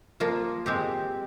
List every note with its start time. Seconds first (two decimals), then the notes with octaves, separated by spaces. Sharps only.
0.20 F3 A#3 F4
0.66 G#3 C4 G4